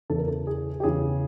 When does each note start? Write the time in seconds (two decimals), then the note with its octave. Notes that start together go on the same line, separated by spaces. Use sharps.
0.10 E2 C#3 E3 A4
0.18 A#4
0.28 A4
0.47 G#4
0.80 G4
0.83 E2 C#3 E3 G#4